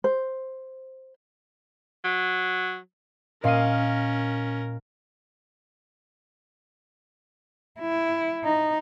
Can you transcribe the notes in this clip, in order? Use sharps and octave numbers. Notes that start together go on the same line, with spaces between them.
C5
F#3
A#2 C#4 A#4 D#5 F5 C7 D#7
E4
D#4